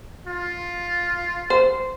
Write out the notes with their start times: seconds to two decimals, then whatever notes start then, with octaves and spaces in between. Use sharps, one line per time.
0.27 F4
1.50 C5